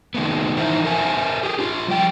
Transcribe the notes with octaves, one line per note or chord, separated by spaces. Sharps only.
D#3 G#3 A3 B3
E3 D#4 E4 A#4 C5 E5
A4 A#4 C5 E5 G#5 A5
G4 G#4
D4 F4
F3 G3 G5